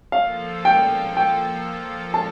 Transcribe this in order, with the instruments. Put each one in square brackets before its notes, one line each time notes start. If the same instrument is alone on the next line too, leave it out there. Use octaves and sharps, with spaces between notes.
[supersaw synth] F3 A#3 F4 A4 [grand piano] F5
[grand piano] G5
G5
A5